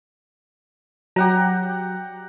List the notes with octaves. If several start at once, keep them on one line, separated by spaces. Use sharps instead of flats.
F#3 G4 F#5 A#5